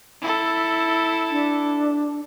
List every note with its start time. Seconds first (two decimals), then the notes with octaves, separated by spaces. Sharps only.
0.21 E4 A4
1.31 D4